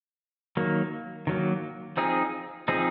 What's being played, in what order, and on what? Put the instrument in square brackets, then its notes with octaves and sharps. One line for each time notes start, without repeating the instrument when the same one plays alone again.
[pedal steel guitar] D#3 F#3 A#3
D#3 F#3 A#3
F3 C4 D#4 G#4
F3 C4 D#4 G#4